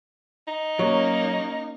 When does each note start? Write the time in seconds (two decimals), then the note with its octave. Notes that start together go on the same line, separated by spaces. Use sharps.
0.47 D#4
0.79 F#3 A#3 C#4